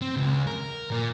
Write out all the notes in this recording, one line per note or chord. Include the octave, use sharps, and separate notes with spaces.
C4
C#2
A#4
A#2